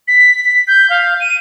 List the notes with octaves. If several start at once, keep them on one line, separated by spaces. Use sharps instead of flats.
B6
B6
G6
F5
D#7